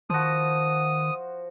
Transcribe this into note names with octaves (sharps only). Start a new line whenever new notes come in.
D#3 F3 F#4 D#6